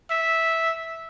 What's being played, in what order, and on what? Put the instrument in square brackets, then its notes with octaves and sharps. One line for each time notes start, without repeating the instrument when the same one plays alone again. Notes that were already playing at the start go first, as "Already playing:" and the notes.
[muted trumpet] E5